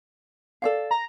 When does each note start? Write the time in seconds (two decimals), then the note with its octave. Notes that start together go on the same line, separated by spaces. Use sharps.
0.62 A4 D5 F5
0.91 A#5